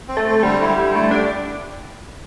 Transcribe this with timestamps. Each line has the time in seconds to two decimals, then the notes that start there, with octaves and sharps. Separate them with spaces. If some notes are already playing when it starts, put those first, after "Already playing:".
0.08 C4
0.17 A3
0.25 C4
0.39 A3
0.43 D3 G3
0.61 E4
0.70 G3
0.78 D3
0.95 A3 E4
1.11 D4 G4